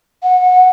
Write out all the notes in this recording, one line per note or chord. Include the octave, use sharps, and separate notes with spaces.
F#5